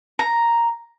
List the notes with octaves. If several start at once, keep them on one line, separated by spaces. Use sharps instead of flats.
A#5